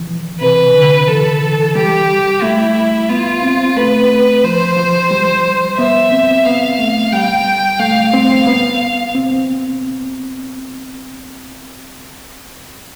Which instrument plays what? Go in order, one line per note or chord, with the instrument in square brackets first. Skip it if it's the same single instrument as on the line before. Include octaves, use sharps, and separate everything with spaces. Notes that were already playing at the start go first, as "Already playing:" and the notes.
Already playing: [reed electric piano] E3 F3
[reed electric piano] C3 [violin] B4
[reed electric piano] D3
[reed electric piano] E3 [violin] A4
[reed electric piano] G3 [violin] G4
[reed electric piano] A3 [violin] E4
[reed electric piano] B3 [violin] F4
[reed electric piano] C4
[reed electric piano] A3 [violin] B4
[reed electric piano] F3 [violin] C5
[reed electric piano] F3
G3
[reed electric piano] B3 [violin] E5
[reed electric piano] C4
[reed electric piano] B3 [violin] F5
[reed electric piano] A3
[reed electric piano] G3 [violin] G5
[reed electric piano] A3 [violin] F5
[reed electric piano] C4
B3
C4